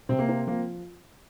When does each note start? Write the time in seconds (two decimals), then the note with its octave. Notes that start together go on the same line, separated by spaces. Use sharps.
0.09 C3 C4
0.19 A#3
0.29 C4
0.47 F3 A#3